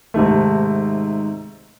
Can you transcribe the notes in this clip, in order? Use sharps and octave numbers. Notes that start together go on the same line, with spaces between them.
G#2 C3 D#3 A3